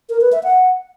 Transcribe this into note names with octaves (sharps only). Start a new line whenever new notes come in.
A#4
B4
E5
F#5